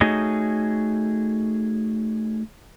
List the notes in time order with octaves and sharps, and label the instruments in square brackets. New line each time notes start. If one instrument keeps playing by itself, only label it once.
[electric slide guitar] A3 D#4 F#4 G#4 C#5 D#5